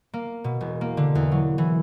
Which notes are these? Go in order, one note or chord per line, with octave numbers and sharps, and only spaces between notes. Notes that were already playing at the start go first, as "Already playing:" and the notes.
A#3
B2
E1
A#3
D3
E2
F#3
E3